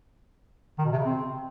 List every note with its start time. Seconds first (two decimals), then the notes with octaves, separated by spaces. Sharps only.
0.78 D#3
0.85 B2
0.92 C3
0.99 C#3
1.06 C4